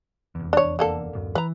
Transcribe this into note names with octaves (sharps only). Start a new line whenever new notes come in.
F1 E2
D4 C#5
D3 A#3 A4
D1 F#2
E3 B4 A#5